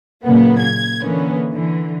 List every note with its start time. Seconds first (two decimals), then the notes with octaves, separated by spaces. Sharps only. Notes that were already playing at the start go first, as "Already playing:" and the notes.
0.24 A#2 C#3 F#3 A#3 B3
0.61 G#6
1.02 D3 E3 A#3 B3 C#4
1.53 D3 E3